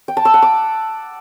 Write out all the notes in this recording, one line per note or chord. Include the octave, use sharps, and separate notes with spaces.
G5
A5
E6
F#5
D6